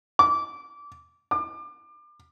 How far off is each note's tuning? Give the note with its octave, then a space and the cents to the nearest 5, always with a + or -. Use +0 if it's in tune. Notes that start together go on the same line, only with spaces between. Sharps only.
D6 -20
D6 +30